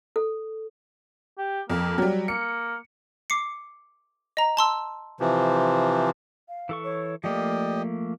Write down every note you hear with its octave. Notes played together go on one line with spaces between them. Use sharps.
A4
G4
F2 A#3
F#3 G3
A#3 C#7
D6 C7 C#7
D#5 A#5
A5 C6 E6
C3 E3 F3
F5
E3 A4 C#6
C#5
F3 A3 A#3 G4 D5 D#5